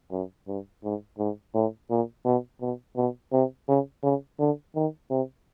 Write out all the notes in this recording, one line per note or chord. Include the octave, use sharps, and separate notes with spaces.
F#2
G2
G#2
G#2
A2
A#2
B2
B2
B2
C3
C#3
C#3
D3
D#3
C3